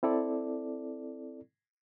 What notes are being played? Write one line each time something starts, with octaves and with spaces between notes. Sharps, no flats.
C4 E4 A4 D5